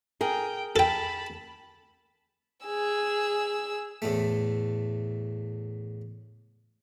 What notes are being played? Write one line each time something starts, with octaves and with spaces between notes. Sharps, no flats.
G#4 A#4 G5
A4 G5 A5 B5
G#4 E6
E2 A2 A3